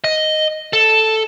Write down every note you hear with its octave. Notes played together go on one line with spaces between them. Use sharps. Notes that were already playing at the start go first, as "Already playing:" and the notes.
D#5
A4